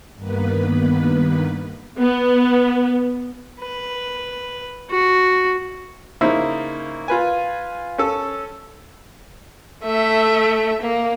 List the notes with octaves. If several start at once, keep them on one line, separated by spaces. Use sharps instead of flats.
G2 D#3 A#3 B3 B4
B3
B4
F#4
C#3 A#3 D#4 E4 C5 E5
F4 B4 G#5
C#4 A4
A3 E5
A#3